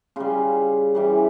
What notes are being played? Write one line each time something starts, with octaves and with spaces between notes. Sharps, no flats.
C#3 G3 F4
C#3 E3 G3